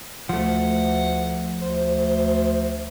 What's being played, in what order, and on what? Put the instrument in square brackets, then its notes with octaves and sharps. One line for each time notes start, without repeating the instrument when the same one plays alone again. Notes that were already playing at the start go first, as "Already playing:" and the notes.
[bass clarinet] D2 [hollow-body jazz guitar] F3 A3 [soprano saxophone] F#5
[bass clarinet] D2 [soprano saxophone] C5